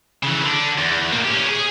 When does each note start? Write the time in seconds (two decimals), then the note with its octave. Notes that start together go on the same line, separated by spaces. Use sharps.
0.23 C#3 E3
0.44 D3 D4
0.78 E2
1.12 A2 A#3
1.24 C#4 G4
1.49 G#4